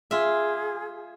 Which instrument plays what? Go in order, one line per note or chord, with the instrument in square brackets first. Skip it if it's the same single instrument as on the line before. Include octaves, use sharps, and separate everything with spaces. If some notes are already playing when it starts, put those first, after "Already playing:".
[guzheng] F4 E5 [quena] G#4